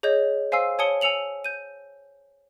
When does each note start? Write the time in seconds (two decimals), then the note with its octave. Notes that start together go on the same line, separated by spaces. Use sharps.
0.03 G#4 C#5 D#5 G6
0.52 C5 F5 G#5 C6 E6 C7
0.79 C#5 G#5 A5 D#6 C#7 G7
1.01 G#5 E6 C#7 F7 F#7
1.44 G6 D#7